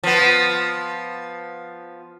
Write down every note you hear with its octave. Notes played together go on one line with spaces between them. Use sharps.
F3 B3